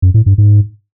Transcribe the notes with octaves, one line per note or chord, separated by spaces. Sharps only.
F#2
A2
G2
G#2